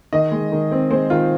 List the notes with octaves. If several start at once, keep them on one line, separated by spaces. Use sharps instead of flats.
D#3 D#5
G#3
D#3
C4
G#3 C5
D#3 F4